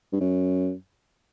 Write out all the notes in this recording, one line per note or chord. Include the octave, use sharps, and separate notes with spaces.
G2
F#2